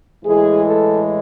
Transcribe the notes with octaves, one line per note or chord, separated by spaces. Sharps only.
A2 E3 G#3 G#4
A4